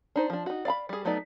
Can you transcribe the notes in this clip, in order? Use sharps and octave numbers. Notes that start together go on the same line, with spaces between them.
D4 D#4 C5
F3 D4
D#4 F#4
D5 F5 A#5 B5
G3 G#4
F#3 A3 B3 D#4 D5